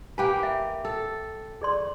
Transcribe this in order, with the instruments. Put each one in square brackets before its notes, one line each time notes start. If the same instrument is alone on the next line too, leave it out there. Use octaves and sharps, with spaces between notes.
[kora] A#3 G4 B4 [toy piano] G#5
[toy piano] E5
[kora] A4
[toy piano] G#4 D5 C6